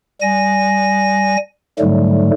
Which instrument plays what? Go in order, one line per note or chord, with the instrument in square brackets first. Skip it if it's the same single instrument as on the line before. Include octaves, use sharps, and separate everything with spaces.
[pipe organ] G3 G#5 A#6
G#2 D3 F#3 G3 A3